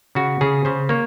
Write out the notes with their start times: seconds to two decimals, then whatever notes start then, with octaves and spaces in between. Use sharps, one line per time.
0.15 C#3 F#4
0.41 C#3 G#4
0.65 C#3 C5
0.89 A#3 C#5